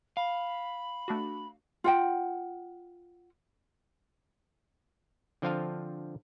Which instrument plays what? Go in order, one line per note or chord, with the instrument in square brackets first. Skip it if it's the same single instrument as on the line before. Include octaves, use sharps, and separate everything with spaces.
[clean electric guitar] F5 [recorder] B5
[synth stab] A3 D4 F#4
[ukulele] F4 F#5 G5
[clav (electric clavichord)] D3 F3 C4 F4 F5 A5